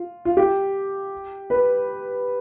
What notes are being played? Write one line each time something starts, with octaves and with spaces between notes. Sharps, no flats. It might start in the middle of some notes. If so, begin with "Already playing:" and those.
Already playing: F4
F4
G4
B4